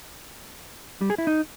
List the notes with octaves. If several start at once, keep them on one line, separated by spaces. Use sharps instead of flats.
G3
G#4
E4
D#4